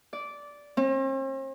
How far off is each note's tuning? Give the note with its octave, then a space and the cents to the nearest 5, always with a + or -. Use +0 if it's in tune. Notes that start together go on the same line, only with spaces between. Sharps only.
D5 -10
C4 +45